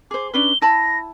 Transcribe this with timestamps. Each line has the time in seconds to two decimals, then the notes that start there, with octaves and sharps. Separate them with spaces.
0.11 G#4 C5 D6
0.34 C#4 D4 B4 G7
0.62 E4 A5 B5 A#6